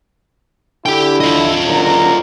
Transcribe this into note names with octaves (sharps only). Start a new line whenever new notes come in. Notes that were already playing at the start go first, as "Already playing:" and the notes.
D3 E4 G4 G5
F4 D#5
F#1 D3 A#5